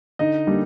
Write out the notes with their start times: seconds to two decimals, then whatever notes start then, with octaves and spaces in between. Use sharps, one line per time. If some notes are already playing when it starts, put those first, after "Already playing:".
0.19 D3 D#4 D#5
0.47 G3 A#3 D4